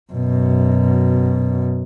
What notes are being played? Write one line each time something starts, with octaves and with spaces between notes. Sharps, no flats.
F#2 B2